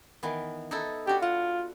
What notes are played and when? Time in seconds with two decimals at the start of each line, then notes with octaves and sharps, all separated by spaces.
0.23 D#3 E3 B3
0.71 D#4 E4 A4
1.07 D4 F#4 G4
1.22 F4 F#5